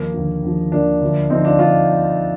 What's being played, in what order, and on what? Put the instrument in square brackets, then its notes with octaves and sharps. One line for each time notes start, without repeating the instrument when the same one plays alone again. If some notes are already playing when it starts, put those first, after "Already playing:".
Already playing: [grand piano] D#2 F3 A#3
D#2 D3 F3
D#2 D3 F3
D#2 D3 F3 A#3 D4
D2 D3 F3
D2 D3 F3 C4 D#4
D4 F4
D3 F3 D4 F4